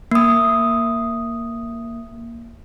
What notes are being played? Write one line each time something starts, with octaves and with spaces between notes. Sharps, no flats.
A#3 D#6